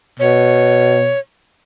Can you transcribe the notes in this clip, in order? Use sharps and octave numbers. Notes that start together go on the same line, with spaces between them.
B2 C#5